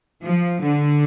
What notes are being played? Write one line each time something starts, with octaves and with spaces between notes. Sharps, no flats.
F3
D3